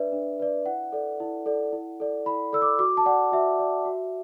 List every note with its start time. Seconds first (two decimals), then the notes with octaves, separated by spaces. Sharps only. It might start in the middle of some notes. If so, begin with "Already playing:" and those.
Already playing: D4 B4 D5 E5
0.12 D4
0.40 B4 D5
0.66 E4 F#5
0.92 A4 D5
1.20 E4
1.46 A4 D5
1.73 E4
2.00 A4 D5
2.26 E4 B5
2.53 A4 D5 E6
2.62 D6
2.79 F#4 D6
2.97 A5
3.06 D5 F#5
3.32 F#4 E5
3.59 D5
3.86 F#4